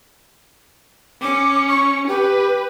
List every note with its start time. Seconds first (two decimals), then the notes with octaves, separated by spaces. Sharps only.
1.22 C#4 D6 C#7
1.68 C#6
2.08 G4 B4